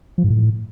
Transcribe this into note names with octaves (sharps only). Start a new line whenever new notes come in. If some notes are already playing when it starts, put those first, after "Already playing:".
F3
G#2
A2